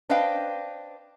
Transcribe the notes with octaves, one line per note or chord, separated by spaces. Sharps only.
D4 B4 C5 D#5 F5 G5